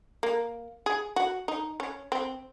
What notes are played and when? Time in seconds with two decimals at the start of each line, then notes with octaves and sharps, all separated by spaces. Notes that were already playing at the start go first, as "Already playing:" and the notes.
0.23 A#3
0.86 G#4
1.16 F#4
1.48 D#4
1.80 C#4
2.12 C4